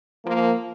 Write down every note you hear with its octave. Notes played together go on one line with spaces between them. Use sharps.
F3 A#3